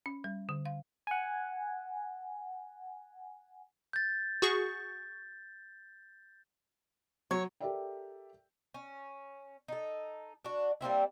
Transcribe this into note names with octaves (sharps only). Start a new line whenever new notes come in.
C#4
G3
D3
F5
F#5 G#5
G6 A6
F#4 G#4 C#6
F#3 C#5
G4 A4 A#4 D5 E5 G5
C#4
D#4 A4
D4 F#4
G3 A#3 C4 E4